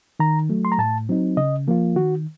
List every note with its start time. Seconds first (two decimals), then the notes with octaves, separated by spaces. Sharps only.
0.20 D#3 A#5
0.50 F#3 A3
0.65 C6
0.72 A#5
0.78 A2 A5
1.09 F#3 C4 D#4
1.37 C#3 D#5
1.68 F3 A#3 F4
1.96 D#3 F#4